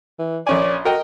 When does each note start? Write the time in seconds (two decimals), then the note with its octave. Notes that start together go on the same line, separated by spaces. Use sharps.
0.19 E3
0.47 A#1 C#4 D5 G#5
0.85 F#4 A#4 D#5 G5